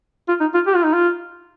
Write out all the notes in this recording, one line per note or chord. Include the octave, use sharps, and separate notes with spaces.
F4
D#4
F4
G4
F4
D#4
F4